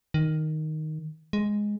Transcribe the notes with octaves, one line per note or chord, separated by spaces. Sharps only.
D#3
G#3